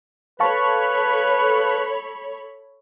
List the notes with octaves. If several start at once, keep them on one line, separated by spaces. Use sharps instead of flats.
A4 B4 C#5 F5 A5 B5 C#6